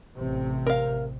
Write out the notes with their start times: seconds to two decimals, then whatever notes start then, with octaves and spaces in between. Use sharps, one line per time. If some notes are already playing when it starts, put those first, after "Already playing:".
0.15 A1 C3
0.67 A#4 F5